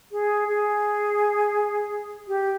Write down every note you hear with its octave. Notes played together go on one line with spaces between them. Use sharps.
G#4
G#4
G4